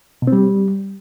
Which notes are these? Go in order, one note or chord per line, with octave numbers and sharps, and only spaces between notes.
B2
C4
G3